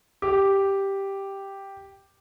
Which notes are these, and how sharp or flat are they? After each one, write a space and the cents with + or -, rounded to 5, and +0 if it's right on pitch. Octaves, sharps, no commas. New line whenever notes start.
G4 +0